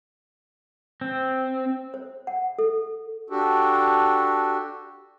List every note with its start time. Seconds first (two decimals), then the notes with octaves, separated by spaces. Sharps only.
1.01 C4
1.94 C5
2.27 F#5
2.59 A4
3.30 D4 F#4 G4 A4